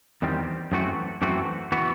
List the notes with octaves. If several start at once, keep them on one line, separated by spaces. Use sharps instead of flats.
E2 D#3 G3 C4
F#2 E3 A3 C4 F#4
F#2 E3 A3 C4 F#4
E3 B3 F#4